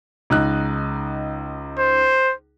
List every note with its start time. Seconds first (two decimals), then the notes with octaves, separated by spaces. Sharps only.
0.30 C#2 D#4 F#6
1.79 C5